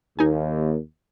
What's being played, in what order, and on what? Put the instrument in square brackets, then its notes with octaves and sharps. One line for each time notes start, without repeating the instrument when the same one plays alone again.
[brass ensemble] D#2 [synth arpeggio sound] D#4 G#5